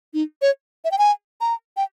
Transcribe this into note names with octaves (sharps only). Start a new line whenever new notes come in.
D#4
C#5
E5
G5
G#5
A#5
G5